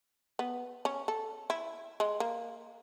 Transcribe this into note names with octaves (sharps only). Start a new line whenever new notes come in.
B3
C#4
A4
E4
G#3
A#3